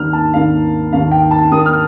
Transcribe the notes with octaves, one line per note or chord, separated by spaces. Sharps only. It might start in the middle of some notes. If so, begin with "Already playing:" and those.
Already playing: D#2 D#3 A#3 D4 F6
A5
D#2 D#3 A#3 D4 F5
D#2 D#3 A#3 D4 F5
G5
A5
D#2 D#3 A#3 D4 D#6
F6